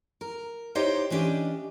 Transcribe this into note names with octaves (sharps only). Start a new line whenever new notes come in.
A#4
D#4 E4 G4 C5 C#5 D#5
E3 C#4 D4 G4 B4 D#5